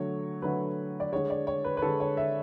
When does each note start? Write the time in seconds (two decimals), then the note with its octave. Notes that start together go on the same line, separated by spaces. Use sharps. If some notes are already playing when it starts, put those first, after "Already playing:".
Already playing: D3 F#3 A3 C#5
0.42 D3 F#3 A3 B4
1.00 D5
1.12 D3 G#3 C#5
1.30 D5
1.47 C#5
1.65 B4
1.77 B4
1.82 D3 G#3 A4
2.00 C#5
2.17 E5